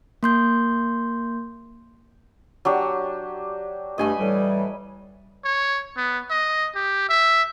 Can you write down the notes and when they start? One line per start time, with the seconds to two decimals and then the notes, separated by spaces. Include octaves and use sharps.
0.23 A#3 C6 G6
2.65 F#3 D4 G4
3.98 G2 A3 D#5 G#5 B5
4.18 A2 E3 G3
5.44 C#5
5.97 B3
6.30 D#5
6.75 G4
7.09 E5